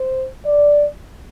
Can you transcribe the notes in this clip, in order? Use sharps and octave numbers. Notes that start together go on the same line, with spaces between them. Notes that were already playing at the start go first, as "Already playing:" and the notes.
Already playing: C5
D5